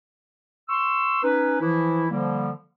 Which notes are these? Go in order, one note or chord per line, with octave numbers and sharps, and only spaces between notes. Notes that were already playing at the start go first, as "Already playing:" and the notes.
C6 C#6 E6
C#4 D#4 B4
E3 F3 E4
D3 F3 G3 A#3